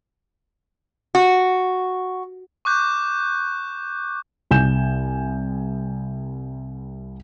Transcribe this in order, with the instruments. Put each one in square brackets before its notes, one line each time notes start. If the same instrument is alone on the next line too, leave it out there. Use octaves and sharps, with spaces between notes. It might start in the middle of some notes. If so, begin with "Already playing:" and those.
[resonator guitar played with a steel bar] F#4
[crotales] C#6 D6 F#6 G6
[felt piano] C2 G#5 G6 E7